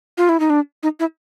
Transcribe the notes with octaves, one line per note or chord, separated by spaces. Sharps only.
F4
E4
D#4
D4
D#4
E4